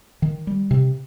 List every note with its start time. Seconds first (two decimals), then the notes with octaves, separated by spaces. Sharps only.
0.22 D#3
0.47 G3
0.71 C3